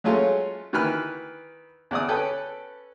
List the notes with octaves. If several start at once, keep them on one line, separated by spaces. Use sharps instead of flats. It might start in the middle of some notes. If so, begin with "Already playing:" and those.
F#3 G#3 A3 C#4 F4
D#3 E3 B4 B5 F6
E2 D5 D#6
C#4 A4 B4 G5